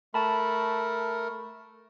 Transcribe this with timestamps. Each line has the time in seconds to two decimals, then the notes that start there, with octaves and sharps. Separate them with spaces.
0.14 A3 A#4 A5 B5